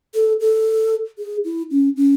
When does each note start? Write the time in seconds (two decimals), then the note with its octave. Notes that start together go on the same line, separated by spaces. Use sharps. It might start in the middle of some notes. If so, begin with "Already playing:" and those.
0.15 A4
0.40 A4
1.19 G#4
1.44 E4
1.71 C#4
1.97 C#4